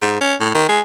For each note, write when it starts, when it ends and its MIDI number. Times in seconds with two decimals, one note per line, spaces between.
0.02 0.16 44
0.21 0.35 61
0.40 0.50 45
0.54 0.68 51
0.69 0.81 56